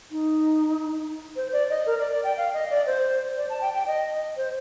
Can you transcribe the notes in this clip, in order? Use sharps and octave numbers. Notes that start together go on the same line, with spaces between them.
D#4
C5
D5
D#5
A#4
D5
D5
G5
F5
D#5
D5
C5
D5
A5
G5
G5
D#5
C5